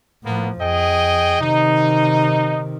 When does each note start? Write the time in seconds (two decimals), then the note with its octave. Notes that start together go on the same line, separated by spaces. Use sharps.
0.24 A2 F3 A#3 B3
0.61 F2 G#4 D#5 G5
1.41 C3 D#3 D#4